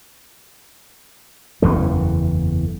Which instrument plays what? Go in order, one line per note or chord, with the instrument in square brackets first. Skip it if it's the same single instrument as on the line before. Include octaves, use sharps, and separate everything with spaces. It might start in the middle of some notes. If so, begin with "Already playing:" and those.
[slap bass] F#1 E2 E3 A3